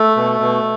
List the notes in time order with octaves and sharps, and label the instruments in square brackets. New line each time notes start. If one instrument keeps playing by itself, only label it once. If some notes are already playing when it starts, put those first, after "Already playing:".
Already playing: [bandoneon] A3
B2
B2